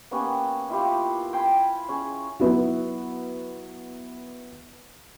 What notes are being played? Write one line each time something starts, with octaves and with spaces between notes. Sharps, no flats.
A#3 B3 C#4 G4
E4 F4 G4
G5 G#5 B5 C6
C#4 G#4
F#3 B3 E4 F#4